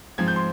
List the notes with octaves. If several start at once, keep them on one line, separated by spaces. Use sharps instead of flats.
G#2 F3 C4 G#6
G6
C6